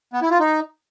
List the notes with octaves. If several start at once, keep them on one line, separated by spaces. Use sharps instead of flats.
B3
E4
F4
D#4